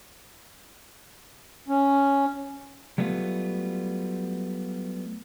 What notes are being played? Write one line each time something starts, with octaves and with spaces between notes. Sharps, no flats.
C#4
F#3 G3 A3 B3 F4